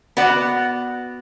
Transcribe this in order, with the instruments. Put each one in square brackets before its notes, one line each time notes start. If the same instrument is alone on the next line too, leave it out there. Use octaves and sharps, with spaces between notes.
[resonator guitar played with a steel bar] B3 F#4 D5 F#5